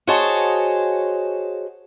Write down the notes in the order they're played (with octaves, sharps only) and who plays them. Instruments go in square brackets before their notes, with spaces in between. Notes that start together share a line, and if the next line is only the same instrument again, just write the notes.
[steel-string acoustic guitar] F#4 G#4 C5 C#5 D#5 A5